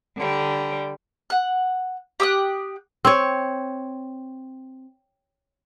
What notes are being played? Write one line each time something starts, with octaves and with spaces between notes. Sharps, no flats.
D3 G3
F#5 F#6
G4 G5 D#6 F#6
C4 C#5